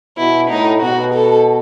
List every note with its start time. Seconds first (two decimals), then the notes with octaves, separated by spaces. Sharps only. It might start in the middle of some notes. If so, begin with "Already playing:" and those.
0.18 B2 E4
0.50 A2 D#4
0.82 B2 F#4
1.14 A4